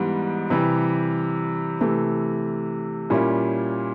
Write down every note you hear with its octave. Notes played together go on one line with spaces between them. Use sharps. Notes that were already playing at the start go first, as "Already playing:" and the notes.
Already playing: G#2 E3 G3 B3
C3 E3 G3
C3 E3 A3
A#2 G3 A#3 C#4 E4